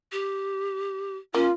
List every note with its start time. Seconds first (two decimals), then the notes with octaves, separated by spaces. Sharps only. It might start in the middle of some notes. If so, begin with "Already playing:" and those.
0.12 G4
1.34 A#3 C#4 F4